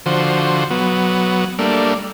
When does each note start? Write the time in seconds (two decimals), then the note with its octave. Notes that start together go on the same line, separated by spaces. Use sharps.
0.06 D3 F3 F#4 C5
0.70 F#3 B3
1.59 G3 A3 A#3 D4